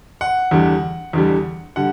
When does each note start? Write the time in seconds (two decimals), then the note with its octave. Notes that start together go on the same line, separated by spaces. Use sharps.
0.21 F#5
0.51 E2 D3 G3
1.13 E2 D3 G3
1.76 D3 G3 F#5